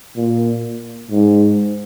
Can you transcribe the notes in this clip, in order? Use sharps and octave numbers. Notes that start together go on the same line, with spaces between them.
A#2
G#2